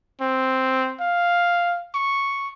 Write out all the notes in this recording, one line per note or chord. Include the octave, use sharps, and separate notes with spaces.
C4
F5
C#6